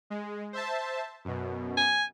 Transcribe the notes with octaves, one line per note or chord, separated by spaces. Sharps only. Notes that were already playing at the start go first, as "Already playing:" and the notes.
G#3
C5 E5 A5
F#2 B2
G#5